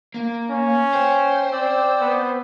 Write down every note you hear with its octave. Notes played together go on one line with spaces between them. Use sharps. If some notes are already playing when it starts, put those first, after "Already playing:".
A#3
C#4
C5 G5
C4 D5 E6
B3